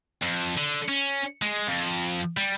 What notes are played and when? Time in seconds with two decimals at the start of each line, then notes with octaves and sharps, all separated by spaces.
0.22 F2
0.57 D3
0.88 C#4
1.42 G#3
1.68 F2
2.37 G3